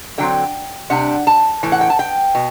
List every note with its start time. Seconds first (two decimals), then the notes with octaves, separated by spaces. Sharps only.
0.18 D3 F#3 C4 G5
0.90 C3 G3 D4 F#5
1.27 A5
1.63 A2 E3
1.72 F#5
1.81 G5
1.90 A5
1.99 G5
2.35 B2